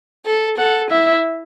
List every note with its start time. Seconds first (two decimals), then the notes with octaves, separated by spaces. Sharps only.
0.25 A4
0.58 A4 F#5
0.91 E4 E5